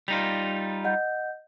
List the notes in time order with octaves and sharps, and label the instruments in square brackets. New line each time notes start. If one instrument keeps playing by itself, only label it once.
[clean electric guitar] G3 D#4 F4 [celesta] F7
[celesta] D#5 F#5 G6